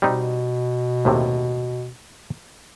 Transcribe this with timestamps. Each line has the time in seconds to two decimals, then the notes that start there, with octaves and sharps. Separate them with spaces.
0.02 B2 G3 C4 D#4
1.05 D#2 A2 C3